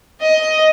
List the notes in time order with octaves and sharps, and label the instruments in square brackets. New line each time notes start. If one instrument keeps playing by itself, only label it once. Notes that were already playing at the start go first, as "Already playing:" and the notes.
[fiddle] D#5